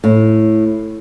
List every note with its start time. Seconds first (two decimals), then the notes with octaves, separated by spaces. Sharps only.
0.04 A2